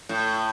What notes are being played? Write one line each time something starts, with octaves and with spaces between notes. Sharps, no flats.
A2